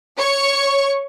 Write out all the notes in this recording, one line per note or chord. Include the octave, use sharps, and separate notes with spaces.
C#5 C#6